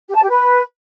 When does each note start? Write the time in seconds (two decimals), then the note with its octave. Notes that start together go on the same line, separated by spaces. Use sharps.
0.09 G4
0.16 A5
0.22 G4
0.29 B4